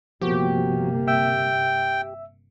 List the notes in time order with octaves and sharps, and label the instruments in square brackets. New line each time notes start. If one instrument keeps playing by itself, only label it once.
[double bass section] G1 C3 A#3 [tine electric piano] F3 B3 F#4 [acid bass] G4
[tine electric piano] E5 E6 [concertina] G5